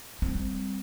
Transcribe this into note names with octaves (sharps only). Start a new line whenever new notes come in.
G3 C4